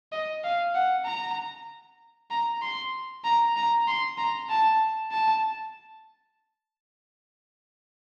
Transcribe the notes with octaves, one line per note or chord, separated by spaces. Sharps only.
D#5
F5
F#5
A#5
A#5
C6
A#5
A#5
C6
A#5
A5
A5